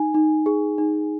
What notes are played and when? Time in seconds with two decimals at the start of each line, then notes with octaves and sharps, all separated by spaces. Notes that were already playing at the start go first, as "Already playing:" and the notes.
Already playing: D#4 G#5
0.14 D#4
0.46 G#4
0.78 D#4